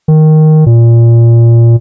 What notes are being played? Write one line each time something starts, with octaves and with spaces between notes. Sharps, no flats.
D#3
A#2